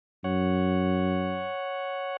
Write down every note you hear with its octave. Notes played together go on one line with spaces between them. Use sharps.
F#2 C#5 F#5